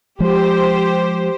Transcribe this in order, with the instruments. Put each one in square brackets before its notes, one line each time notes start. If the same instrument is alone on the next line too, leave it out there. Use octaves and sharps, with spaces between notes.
[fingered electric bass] F3 G#3 [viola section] G4 C5